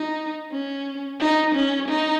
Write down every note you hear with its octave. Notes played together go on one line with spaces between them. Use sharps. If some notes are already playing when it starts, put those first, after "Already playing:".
Already playing: D#4
C#4
D#4
C#4
D#4